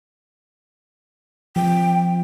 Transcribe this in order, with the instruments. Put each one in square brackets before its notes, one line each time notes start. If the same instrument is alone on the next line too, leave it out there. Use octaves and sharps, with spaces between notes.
[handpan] F3 [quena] G5